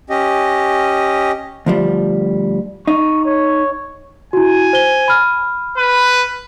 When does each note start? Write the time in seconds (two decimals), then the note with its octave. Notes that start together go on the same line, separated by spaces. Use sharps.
0.10 C#4 G4 D#5
1.66 D2 F3 G3
2.87 D#4 C#6
3.25 C#5
4.33 E4 F#4 G#5
4.73 C5 G7
5.08 B5 F6
5.77 B4